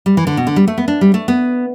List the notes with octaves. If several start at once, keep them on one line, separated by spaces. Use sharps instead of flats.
G3
E3
D3
B2
D3
G3
A3
B3
D4
G3
A3
B3